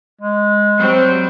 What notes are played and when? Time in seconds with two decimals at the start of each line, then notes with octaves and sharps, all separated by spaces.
0.21 G#3
0.78 F#3 G3 C4